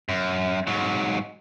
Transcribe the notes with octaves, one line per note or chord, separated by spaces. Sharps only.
F#2
G#2 F#3